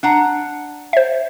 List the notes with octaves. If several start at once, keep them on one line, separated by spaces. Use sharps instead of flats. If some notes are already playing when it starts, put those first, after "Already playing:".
D4 F#5 A#5
C5 E5